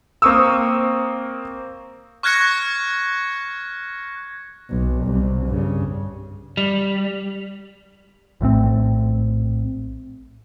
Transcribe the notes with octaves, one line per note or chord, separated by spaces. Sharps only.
A#3 C4 A#4 C#6 D#6 E6
C#6 F6 F#6 G#6 A#6 C#7
B1
C2
G2 C#3
G3
A#1 A2 A3 C4